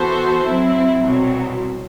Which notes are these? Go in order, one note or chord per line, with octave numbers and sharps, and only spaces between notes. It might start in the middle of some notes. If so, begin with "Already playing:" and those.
Already playing: E3 B3 F#4 A4 C5
F#3 C4 E4
C2 B2 F#3 C4